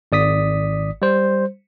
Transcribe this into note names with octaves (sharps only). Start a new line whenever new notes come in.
G#1 D5 D#6 B6
G3 C5